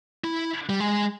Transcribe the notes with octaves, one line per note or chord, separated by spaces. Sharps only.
E4
G3
G#3